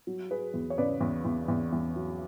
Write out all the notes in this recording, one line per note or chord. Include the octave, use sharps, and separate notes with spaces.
F#3
F#3 G#4 B4
E2
C#5
C#3 B4 D5
E2
E2
E2
E2
F#3